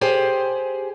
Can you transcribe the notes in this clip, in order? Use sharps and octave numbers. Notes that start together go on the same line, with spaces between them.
G4 G#4 C5